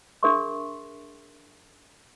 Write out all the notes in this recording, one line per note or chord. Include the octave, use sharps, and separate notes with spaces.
D4 G#4 A#4 E5 C6 C#6